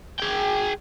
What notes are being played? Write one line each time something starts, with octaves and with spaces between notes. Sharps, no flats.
G#4 G5